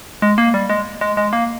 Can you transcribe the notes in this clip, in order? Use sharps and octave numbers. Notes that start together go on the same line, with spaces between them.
G#3
A#3
G3
G#3
G#3
G#3
A#3